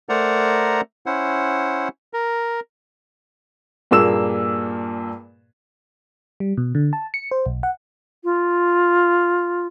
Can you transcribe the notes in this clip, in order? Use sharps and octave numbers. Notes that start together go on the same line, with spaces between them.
A3 A#4 C5 D5 F#5 A#5
C#4 E4 C5 F#5
A#4
G2 A#2 A#3 G#4 E6 E7
G3
B2
D3
A5
C#7
C5
B1
F#5
F4